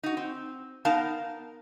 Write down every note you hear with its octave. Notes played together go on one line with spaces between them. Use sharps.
D#4 F#4
C4
B3 D#4 A#4 F5 A5